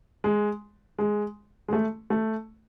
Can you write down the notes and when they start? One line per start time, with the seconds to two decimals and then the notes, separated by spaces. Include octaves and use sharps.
0.24 G#3
0.99 G#3
1.68 G#3
1.73 A3
2.10 A3